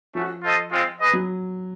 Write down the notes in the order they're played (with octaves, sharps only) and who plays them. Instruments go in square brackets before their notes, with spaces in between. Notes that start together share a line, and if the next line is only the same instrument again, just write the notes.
[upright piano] F3 [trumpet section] A3 C#4 F#4
[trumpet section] F4 A4 C5 D#5
G#3 C4 F4
G#4 B4 D#5
[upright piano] F#3